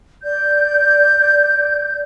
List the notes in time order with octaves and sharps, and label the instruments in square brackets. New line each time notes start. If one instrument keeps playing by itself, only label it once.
[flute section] D5 G6